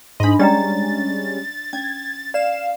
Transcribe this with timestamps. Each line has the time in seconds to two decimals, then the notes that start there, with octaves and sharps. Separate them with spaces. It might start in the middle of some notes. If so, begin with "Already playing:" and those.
0.20 G#2 D4 D#5 B5 C6
0.39 G3 G#3 C#4 D5 G5 A#5 A6
1.73 C#4 G#6
2.34 D5 F5 E7